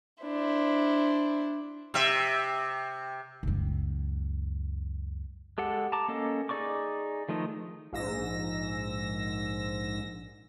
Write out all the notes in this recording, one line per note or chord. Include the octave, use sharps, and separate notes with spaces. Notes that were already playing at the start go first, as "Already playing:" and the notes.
D4 E4 C5
C3 E5
C#2 F#2
G#3 G4 A4 F#5
A5 A#5 D6
A#3 C#4 A4 D#5
D#4 G#4 D5 C#6 D6
D#3 F3 A3 D#4
A#1 G#2 E6 A#6